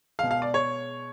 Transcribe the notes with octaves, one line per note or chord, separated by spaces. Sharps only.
B2 G#3 F5
F5
D5
C#5